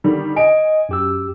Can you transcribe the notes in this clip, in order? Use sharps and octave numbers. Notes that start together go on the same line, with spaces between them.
D3 D#3 G3
D#5 G#5 D7
F#2 G4 E6